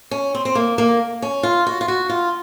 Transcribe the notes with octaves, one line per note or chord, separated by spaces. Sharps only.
C#4
C4
C4
A#3
A#3
C#4
F4
F#4
F4
F#4
F4